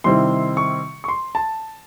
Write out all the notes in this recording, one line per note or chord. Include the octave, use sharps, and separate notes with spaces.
C3 D#3 G3 C4 E4 C6
C#6
C#6
C6
A5